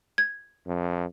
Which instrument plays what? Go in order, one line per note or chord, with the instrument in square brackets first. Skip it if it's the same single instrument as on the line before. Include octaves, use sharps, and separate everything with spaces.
[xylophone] G#6
[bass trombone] F2